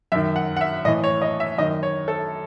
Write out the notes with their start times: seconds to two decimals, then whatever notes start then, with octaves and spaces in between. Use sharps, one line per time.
0.12 F#2 D#3 E5
0.36 F#5
0.57 F#5
0.61 E5
0.85 A2 D#5
0.88 E3
1.04 C#5
1.22 D#5
1.40 E5
1.58 F#2 D#3 D#5
1.83 C#5
2.08 A4